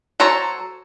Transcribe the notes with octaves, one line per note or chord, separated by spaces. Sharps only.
F#3 A4 C5 C#5 A#5